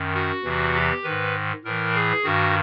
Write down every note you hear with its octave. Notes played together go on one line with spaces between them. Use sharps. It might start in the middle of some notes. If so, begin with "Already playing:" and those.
Already playing: F#2 D#3
F#4
E2 C3 E3
G4
D#3 B4
G#2
A2 E3 A#4
G#4
G2 D#3 F#4